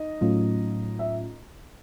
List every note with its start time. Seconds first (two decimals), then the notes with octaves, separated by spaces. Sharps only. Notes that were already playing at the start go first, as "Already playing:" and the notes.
Already playing: D#4 D#5
0.21 A2 F#3 A3 C#4 F4
0.99 E5